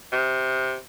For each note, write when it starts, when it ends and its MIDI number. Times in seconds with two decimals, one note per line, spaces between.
0.12 0.76 48